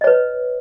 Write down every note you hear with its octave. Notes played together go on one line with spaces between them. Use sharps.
B4 C#5 D#5